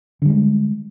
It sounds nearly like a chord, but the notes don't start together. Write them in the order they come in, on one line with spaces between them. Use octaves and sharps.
D3 G3 G#3